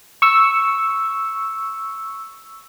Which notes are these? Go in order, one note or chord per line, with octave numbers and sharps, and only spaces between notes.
C#6 E6